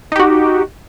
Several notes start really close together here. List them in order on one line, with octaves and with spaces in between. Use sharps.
D#4 G4 F#4